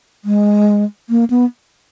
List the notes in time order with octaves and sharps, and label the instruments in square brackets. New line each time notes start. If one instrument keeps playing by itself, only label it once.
[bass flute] G#3
A#3
B3